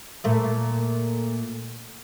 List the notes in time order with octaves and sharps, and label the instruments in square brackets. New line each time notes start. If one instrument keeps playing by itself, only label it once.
[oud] A#2 A3